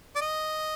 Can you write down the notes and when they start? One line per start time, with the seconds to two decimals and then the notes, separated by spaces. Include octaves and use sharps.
0.16 D5
0.21 D#5